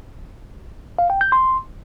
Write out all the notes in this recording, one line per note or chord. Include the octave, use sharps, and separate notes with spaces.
F5
G5
G6
C6